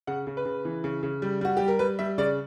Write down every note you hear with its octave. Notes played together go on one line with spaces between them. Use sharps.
C#3 F#5
C#3
B4
C#3
E3
C#3
C#3
G3
G3 F#4
G3 G4
A#4
G3 B4
G3 E5
C#3 D5